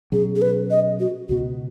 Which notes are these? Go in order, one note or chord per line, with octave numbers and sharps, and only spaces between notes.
B2 F#3 C#4 G#4
G#4
B4
D#5
F#4
C#2 B2 B3 F#4